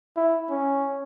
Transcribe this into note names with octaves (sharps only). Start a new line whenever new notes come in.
E4
C#4